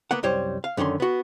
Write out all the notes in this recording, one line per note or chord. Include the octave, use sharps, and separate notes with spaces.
A#3 B3 F#5
C2 F#2 G3 C5 C#5
F5
F#2 D3 D#3 C#4 C6
B3 F#4